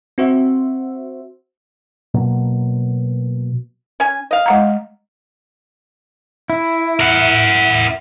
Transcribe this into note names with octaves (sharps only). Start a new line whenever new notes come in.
C4 F#4 C5 E5
B2 F#3 A#3
C#4 G#5
D#5 F5
G#3 F#5 A#5
E4
A#4 F#5